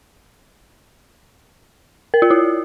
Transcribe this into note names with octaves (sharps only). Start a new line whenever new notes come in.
A#4
F4
E4